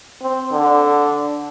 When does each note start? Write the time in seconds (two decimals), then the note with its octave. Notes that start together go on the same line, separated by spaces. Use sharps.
0.22 C4
0.52 D3